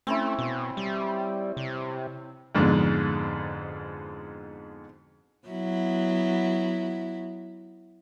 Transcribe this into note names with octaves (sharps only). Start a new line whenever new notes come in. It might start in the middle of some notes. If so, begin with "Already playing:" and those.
A3 C4 C#4 E4
B2
G3
C3
F2 G#2 B2 D3 G#3
F#3 B3 E4